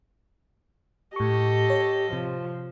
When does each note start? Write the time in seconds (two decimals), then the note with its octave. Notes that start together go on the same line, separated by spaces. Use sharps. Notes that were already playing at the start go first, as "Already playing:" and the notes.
1.16 A2 G4 A4 D#5 C#6
1.70 C#5
2.12 C3 F3